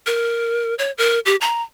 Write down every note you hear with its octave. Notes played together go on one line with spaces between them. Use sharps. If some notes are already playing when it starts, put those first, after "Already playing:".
A#4
C#5
A#4
G4
A#5